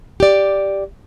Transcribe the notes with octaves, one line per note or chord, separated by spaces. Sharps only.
G4 D5